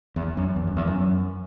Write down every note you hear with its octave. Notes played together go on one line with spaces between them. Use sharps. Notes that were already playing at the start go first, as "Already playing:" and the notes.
E2
F#2
E2
F#2
E2
F#2